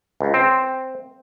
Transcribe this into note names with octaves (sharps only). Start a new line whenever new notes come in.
C#2
C4